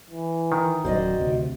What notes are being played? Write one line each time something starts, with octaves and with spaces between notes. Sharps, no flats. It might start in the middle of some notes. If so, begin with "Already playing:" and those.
E3
D#3
D1 F#2 F#4 C5 D5 D#5
D2 C3